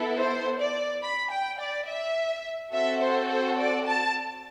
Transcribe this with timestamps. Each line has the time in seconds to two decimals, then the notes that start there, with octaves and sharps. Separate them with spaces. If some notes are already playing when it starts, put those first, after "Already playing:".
Already playing: B3 E4 A4
0.17 C5
0.59 D5
1.03 B5
1.30 G5
1.59 D5
1.87 E5
2.72 C4 F#4 A4 E5
3.01 C5
3.29 C5
3.58 D5
3.86 A5